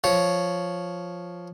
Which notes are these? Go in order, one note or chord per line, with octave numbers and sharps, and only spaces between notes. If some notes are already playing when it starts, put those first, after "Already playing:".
F3 C#5